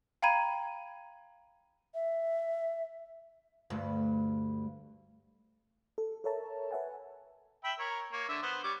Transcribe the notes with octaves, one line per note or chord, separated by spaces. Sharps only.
F5 G5 A#5 B5 G#6 D#7
E5
D2 G2
A4
A4 A#4 C#5 E5 A5 A#5
B4 C#5 E5 F#5 G#5 A5
E5 G5 B5
A#4 C#5
A#3 C#5
D3 E5
B3 C5
G3 C#5 D6